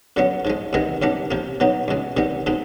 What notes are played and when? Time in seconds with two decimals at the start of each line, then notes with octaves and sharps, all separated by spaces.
0.16 F#2 D3 F#3 B3
0.45 G#2 F3 G#3
0.73 E2 C3 D#3 G#3 B3
1.02 F#2 D#3 G3 B3 D4
1.31 C3 F3 A#3
1.60 B2 F#3 B3 D#4
1.88 C#2 B2 G#3
2.17 C3 D#3 G3 B3
2.46 B2 G#3 C4 D#4